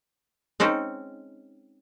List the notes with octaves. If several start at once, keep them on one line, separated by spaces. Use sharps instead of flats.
G#3 C4 C#4 D#4